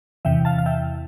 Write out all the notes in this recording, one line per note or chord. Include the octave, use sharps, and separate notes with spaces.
E2 C3 E3 E5 G5
F5 A5
F5
E5 G5